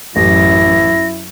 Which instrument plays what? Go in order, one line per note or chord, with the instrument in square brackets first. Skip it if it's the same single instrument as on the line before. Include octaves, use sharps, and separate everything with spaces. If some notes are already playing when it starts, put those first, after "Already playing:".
[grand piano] A1 [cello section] F#2 [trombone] E4 [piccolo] A#6